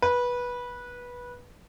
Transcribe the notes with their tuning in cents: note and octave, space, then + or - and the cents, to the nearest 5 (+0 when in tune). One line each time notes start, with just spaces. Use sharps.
B4 -15